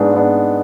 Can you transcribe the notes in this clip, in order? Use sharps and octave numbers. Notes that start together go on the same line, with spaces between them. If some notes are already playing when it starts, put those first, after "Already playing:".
Already playing: G#2 G#3 B3 D4
G#2 G#3 B3 D4